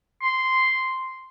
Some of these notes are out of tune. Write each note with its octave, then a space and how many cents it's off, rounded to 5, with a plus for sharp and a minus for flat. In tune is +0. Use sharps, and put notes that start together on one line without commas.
C6 -5